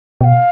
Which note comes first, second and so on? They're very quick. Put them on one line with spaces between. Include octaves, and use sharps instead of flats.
B2 G5 F5